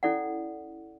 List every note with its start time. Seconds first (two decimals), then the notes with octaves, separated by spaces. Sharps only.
0.03 C#4 E4 A4 D5 F#5